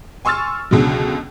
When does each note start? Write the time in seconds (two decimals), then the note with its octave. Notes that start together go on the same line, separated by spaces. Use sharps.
0.25 G#5 C6 C#6 E6 F6 A6
0.71 C#2 B2 D3 F#3